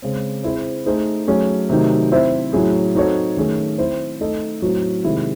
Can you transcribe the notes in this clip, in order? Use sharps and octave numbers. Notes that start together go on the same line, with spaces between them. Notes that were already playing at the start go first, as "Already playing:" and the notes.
C#3 G#3 C4
C4 E4 G#4 C5
A3 D#4 G#4 C5
F#3 A3 C#4 G#4
C3 D#3 F#3 A3 D#4
C4 E4 C5 E5
A2 F#3 C#4 E4 G#4
C4 D#4 F#4 A4 C#5
D#3 A3 C#4 G#4
C4 E4 C5
A3 D#4 A4 D#5
A2 F#3 C4 F#4
C3 D#3 G#3 C4 E4